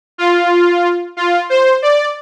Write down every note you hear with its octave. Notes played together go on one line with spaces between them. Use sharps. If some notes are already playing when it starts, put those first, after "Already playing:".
F4
F4
C5
D5